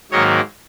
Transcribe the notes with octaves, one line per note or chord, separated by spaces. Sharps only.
G#2 D#3 F#3 A#3 C#5 D#5